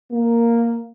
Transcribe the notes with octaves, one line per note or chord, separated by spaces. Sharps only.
A#3